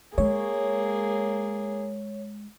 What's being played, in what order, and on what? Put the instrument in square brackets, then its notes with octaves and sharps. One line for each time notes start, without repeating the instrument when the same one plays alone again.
[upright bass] G#3 [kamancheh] A#3 G#4 [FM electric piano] C#5